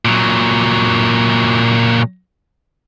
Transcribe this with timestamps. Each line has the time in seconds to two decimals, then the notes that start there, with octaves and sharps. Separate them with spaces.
0.05 A#2 F#3